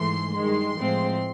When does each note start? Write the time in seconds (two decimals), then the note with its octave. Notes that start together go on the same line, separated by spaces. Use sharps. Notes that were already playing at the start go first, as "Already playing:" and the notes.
Already playing: G#2 E3 A3 C6
0.34 G2 D#3 G#3 C6
0.76 A2 F3 G#3 C4